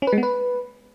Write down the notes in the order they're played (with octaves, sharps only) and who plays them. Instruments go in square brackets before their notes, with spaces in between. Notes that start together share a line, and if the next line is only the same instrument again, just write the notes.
[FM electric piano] C#4
B4
G#3
B3
B4